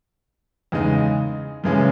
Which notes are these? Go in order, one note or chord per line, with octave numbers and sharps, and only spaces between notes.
E2 C#3 G#3 D#4
F#2 C#3 E3 G#3 C#4